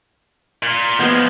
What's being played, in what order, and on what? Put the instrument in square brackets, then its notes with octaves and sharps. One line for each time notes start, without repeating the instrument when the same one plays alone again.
[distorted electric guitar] A#2
[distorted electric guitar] F3 G#3 [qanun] B3 D5 C6